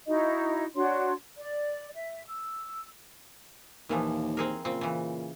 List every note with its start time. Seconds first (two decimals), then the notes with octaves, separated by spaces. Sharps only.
0.07 D#4 E4 F#4 D#5
0.75 D4 F#4 C#5 C6
1.37 D5
1.95 E5
2.26 E6
3.89 D#2 A#2 E3 F3
4.37 C4 G#4 A#4
4.65 A#2 C#3 C4
4.81 C#3 E3